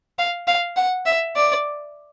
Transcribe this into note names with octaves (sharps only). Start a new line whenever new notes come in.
F5
F5
F#5
E5
D5